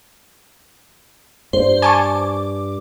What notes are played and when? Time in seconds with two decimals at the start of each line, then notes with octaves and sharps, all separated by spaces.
1.53 G2 C5
1.82 G#5 A5 C#6 D6